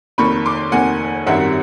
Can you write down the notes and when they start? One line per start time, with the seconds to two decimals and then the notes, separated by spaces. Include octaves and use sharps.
0.18 F1 D#2 D#3 B5 C#6
0.45 C6 D6
0.72 F1 D#2 D#3 F#5 G#5
1.26 G#1 F#2 D#3 G3 E5 F#5